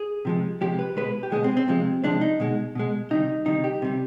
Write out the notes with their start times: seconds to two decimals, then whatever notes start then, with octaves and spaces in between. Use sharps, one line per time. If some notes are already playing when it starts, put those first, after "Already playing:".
Already playing: G#4
0.25 C3 F3 G#3
0.61 C3 F3 G#3 G4
0.79 B4
0.97 B2 G#3 B4
1.23 G4
1.32 B2 G#3 G#4
1.44 C4
1.57 C4
1.68 C3 F3 G#3
2.04 C3 F3 G#3 D4
2.21 D#4
2.40 B2 G#3
2.75 B2 G#3
3.10 C3 D#3 G3 D#4
3.46 C3 D#3 G3 D#4
3.64 G4
3.82 C3 G3